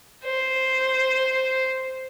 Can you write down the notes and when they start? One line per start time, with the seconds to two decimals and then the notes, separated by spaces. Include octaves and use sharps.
0.24 C5